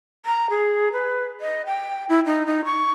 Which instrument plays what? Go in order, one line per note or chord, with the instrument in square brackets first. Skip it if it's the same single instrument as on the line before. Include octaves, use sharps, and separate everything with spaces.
[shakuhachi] A#5
G#4
B4
D#5
G5
E4
D#4
D#4
C#6